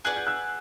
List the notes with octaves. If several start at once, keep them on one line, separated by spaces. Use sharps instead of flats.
G#4 B4 D5 F#5 F#6
G6
E6 F#6